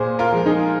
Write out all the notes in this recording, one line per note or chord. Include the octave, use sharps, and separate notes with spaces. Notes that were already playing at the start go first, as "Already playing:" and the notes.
Already playing: A#2 G#4 C5
F4 A#4
F3 G#3
D#4 G#4